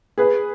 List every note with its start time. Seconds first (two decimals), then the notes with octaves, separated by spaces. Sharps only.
0.18 G#4 B4